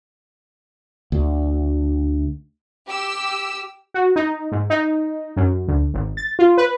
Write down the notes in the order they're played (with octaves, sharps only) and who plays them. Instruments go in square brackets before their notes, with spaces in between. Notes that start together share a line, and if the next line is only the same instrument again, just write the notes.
[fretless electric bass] D2
[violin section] G4 E6
[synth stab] F#4
D#4
G#2
D#4
F#2
D2
G#1
A6
F4
B4